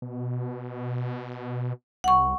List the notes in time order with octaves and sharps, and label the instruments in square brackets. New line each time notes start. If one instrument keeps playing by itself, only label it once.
[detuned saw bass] B2
[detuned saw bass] C2 [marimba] F#5 C#6